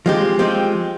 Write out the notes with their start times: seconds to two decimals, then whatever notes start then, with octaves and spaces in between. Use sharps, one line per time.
0.06 F3 G#3 C4 G4
0.39 F3 G#3 C4 G4